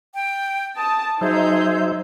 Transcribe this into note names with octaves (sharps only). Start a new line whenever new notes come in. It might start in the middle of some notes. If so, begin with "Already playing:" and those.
G5
A5 D#6
F#3 D#4 G#4 C5 E5 G6